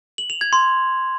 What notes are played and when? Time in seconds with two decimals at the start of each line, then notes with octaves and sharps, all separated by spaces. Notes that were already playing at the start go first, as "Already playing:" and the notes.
0.18 F#7
0.30 F7
0.41 G#6
0.53 C6